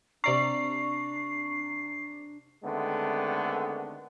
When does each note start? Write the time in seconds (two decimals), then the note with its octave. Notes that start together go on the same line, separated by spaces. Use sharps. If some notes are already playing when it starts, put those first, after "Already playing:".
0.24 C3 D4 D5 A#5 C#6 C7
2.64 D3 D#3 G#3 A3 B3 C4